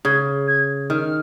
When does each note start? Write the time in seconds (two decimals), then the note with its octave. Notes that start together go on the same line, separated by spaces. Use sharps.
0.05 C#3 G#6
0.47 G#6
0.90 D#3 F6